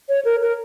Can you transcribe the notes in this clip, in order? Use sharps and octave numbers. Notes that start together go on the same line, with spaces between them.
C#5
A#4
A#4